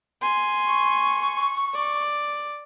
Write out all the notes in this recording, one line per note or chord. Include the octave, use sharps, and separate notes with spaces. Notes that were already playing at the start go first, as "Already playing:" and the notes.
G#5 C6
C#6
D5